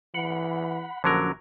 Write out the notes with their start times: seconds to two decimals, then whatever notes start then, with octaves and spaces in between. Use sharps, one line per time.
0.14 E3 F#5 B5
1.04 A#1 D3 F3 F#3 C#4 A#4